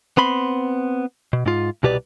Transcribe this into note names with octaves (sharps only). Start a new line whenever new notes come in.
B3 C4 B5 C6
B2
G#2 F4
C2 B2 G4 B4 D5